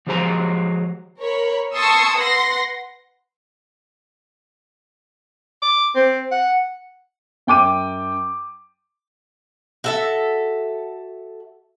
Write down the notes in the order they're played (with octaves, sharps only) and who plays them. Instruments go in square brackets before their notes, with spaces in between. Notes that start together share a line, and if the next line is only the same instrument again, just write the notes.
[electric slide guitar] F3 F#3 G#3 G4 C5 A#5
[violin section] A#4 C#5 B5
A5 C6 C#6 D#6 E6 G#6
B4 F#5 C6 A#6
[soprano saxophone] D6
C4
F#5
[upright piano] F#2 G5 D6 D#7
[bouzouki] F#4 A4 E5